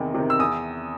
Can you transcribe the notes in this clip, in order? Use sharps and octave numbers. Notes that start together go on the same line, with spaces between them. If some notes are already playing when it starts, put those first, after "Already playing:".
Already playing: E2 C3 D#3
C3 D#3
E6
E2 D#6